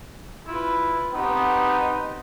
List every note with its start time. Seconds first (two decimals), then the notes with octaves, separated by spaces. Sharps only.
0.47 E4 F4 B4
1.14 B3 C4 D#4 G4